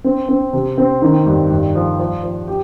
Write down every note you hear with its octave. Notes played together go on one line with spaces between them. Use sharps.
C4
C4
C3
C4
D#3
G2
G2
F3
F3
F3
G4